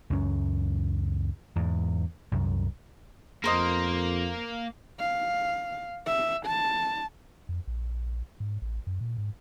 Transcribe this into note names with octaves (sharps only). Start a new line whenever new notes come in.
C#2 F#2 C#4
E2 G#2
C2 F#2
F2 A#3 A#4 C5 D#5
F5
E5
A5
F2
A#1
G#2
A1
F#2
A#2
G#2